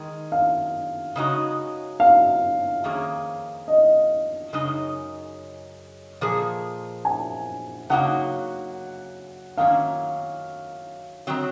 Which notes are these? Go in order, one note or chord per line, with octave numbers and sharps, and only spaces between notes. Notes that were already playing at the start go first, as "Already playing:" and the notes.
Already playing: D#3 G#3
F5
C#3 G#3 D#4 F#4
F5
F2 D#3 A#3 C#4 G#4
D#5
F#2 C#3 G#3 D#4
A#2 F3 G#4
G#5
C#3 F#3 A#3 D#4 F#4 F#5
D#3 F#3 A#3 C#4 F5
D#3 F#3 C4